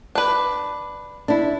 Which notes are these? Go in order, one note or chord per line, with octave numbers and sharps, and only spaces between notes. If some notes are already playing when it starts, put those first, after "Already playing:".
D4 B4
D4 E4